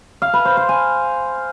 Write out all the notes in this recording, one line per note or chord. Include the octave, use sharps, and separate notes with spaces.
F5
B4
C5
C5
G#5